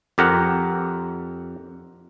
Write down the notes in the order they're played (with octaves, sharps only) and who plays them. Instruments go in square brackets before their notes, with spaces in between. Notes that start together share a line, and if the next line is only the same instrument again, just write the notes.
[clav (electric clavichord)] F2 G4 A#4 F#5